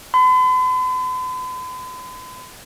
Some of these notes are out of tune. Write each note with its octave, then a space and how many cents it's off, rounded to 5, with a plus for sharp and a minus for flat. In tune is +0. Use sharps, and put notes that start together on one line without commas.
B5 +45